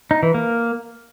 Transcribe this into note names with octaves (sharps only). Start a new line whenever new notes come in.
D#4
E3
A#3